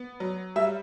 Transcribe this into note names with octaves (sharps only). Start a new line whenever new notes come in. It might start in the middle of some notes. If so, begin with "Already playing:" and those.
Already playing: B3
F#3
G3 E5